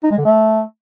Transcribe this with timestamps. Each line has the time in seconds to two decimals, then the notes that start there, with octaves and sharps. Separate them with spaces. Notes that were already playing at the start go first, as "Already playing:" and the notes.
0.04 D#4
0.11 G#3
0.18 D3
0.25 A3